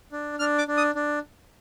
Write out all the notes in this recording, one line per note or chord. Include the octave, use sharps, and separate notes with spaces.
D4
D4 F6
D6
D4
D#6
D4